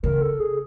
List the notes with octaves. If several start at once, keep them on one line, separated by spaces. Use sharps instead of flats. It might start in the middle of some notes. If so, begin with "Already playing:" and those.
C#3 A#4
A4
G#4